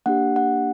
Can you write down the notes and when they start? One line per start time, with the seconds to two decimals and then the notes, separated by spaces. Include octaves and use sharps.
0.06 A#3 D4 G4 F#5
0.36 F#5